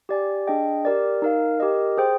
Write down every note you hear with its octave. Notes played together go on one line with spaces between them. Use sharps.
G4 D5 G#5
D4 G#4 D#5 G5
G4 A#4 D5
D#4 A#4 F5
G4 A#4 D#5
G#4 C5 G5